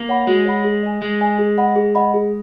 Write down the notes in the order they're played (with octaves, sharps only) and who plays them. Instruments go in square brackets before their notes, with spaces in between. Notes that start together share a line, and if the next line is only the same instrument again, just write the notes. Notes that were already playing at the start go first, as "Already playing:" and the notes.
Already playing: [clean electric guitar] A#3
[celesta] C#5 F#5 B5
[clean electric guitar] G#3 [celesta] F#4
[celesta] C#5 F#5 B5
G#4
D#5 G#5
[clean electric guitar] G#3 [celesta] G#4
[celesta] D#5 G#5
G#4
D#5 F#5 B5
G#4
D#5 F#5 B5
G#4